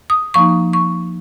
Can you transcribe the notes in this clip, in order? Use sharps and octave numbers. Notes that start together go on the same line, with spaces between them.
D#6
F3 A#3 D#4 C#6
C#6